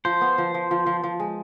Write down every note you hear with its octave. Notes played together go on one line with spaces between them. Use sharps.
F3 C5
B3
F3
F3
F3
F3
F3
G#3